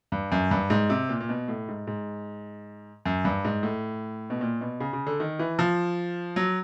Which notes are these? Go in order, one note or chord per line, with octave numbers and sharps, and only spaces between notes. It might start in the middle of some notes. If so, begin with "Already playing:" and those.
G2
F#2
G2
G#2
C3
A#2
A#2
B2
A2
G#2
G#2
F#2
G2
G#2
A2
B2
A#2
B2
C#3
C#3
D3
D#3
E3
F3
F#3